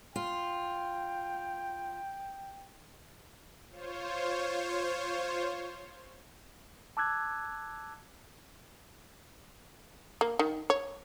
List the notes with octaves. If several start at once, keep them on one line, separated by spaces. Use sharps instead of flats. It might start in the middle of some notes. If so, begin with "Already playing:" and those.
F4 G5
F4 C5 C#5
A5 D6 E6 F#6 G#6
A#3
D#3
C#5